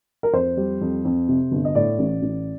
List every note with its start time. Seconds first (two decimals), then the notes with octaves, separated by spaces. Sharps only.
0.23 A#4
0.33 F2 C5
0.57 G3
0.81 F2
1.05 F2
1.28 C3
1.51 G1
1.65 D#5
1.75 A2 D5
1.99 A1
2.22 A1